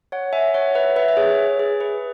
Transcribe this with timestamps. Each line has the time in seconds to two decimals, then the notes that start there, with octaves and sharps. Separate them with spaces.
0.12 C#5 F#5
0.33 E5 G#5
0.54 C#5 F#5
0.75 B4 E5
0.96 B4 E5
1.08 E5
1.17 G#4 C#5
1.59 G#4
1.81 B4